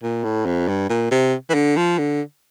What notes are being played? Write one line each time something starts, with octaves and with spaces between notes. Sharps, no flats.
A#2
A2
F2
G2
A#2
C3
E3
D3
F3
D3